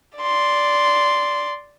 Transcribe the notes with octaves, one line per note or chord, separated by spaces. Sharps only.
D5 C6